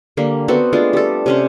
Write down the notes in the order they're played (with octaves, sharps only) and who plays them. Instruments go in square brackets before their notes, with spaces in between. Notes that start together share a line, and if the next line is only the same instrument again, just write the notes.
[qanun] D3 G3 A#3
B3 C4 F#4 A4
G#3 A3 D4 F4
G3 A4
C3 C#4 C5